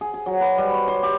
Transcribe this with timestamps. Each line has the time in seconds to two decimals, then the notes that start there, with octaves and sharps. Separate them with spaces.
0.01 G#4
0.14 G#4
0.26 F#3
0.41 B4
0.58 G3
0.72 C#5
0.88 C6
1.03 G4